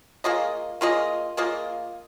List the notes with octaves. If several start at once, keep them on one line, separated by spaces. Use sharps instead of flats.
A#3 F4 G#4 D#5
A#3 F4 G#4 D#5
A#3 F4 G#4 D#5